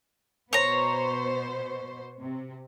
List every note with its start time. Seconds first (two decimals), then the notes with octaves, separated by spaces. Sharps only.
0.53 B2 B3 C5 C#5 A#5
2.21 C3